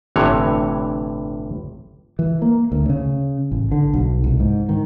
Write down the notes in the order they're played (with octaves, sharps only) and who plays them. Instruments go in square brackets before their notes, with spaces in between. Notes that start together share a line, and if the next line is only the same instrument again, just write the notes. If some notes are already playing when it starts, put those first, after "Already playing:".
[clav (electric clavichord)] G1 A2 C3 E3 C#5
[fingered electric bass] E3
A#3
D2
C#3
A1
D3
B1
C2
G#2
D#3